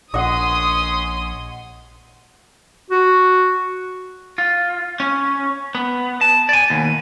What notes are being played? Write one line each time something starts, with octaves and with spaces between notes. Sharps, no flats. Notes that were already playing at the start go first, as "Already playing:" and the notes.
A#1 C#4 D#5 F#5 C6 D#6
F#4
F4
C#4
B3
A5
D5 G#5
D#2 B2